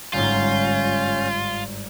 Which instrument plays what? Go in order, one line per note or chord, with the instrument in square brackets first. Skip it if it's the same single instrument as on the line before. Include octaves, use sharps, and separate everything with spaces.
[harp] G1 G#2 [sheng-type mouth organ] C#4 G6 [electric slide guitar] F4